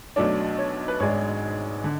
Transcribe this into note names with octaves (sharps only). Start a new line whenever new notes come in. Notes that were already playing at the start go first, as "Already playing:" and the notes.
B1 B2 F#3 A3 D4 D5
C#5
B4
G#1 G#2 G#3 D4 C#5
D3